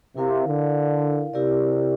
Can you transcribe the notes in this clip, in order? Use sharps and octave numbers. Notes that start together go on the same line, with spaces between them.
C3 E4 A#4 F5
D3
C3 E4 G4 A#4 D5